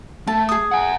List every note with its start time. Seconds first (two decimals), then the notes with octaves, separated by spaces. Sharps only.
0.27 A3 A5
0.49 G#4 D#6
0.71 F#5 G#5